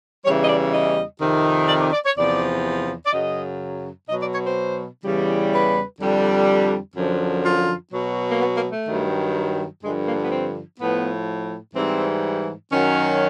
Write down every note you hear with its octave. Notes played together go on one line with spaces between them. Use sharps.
E2 C#3 E3 G3 C#5
D#5
D5
D#5
F2 C3 D#3
D5
D5
D5
C#5
E2 C3 F3 D5
D5
F#2 C#3 F#3 D#5
B2 F#3 D#5
D5
C#5
C5
E2 C#3 E3 G3
B4
F2 D3 G3
F#2 D3 F3
F4
B2 F#3
A#3
B3
A#3
A3
G2 D#3 F#3
G2 D3 F3 G#3
A#3
B3
C4
A2 F3 B3
G#2 E3 G3 C4
F#2 D#3 F#3 C#4